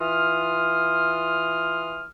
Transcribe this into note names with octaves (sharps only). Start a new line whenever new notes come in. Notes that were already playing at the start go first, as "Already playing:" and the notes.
E3 F4 C6 D#6 F6